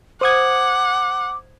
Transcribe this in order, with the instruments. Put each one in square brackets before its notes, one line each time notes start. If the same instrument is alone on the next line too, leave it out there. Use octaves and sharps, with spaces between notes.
[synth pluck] C5 D#6 G#6 [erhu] F#5 [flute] D6